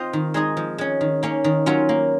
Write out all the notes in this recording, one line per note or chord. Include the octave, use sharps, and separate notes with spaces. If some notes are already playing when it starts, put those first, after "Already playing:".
Already playing: C4 F4 C5 D#5
D#3
G#3 D#4 G#4 D#5
F3
G#3 C#4
D#3
A#3 C#4
D#3
F#3 C#4 F4
A#3